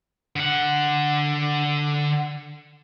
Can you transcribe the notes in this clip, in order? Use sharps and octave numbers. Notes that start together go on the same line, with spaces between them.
D3 F#5